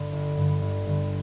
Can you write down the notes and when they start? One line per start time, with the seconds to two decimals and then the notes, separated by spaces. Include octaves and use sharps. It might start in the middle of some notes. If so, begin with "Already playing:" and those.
Already playing: G2 D3
0.13 G1
0.37 G2 D3
0.62 G1
0.86 G2 D3